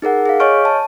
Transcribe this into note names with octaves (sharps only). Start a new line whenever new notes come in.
D#4 G#4 A#4 F#5
G#4 F5
C#5 D#5 G#5 C#6 F6 D7
A5